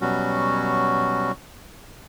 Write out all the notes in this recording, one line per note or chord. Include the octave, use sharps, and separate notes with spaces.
B2 F#3 G3 C#4 F#4